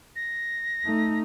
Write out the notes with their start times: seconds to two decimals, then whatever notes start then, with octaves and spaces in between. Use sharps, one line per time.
0.16 A#6
0.85 A3 D#4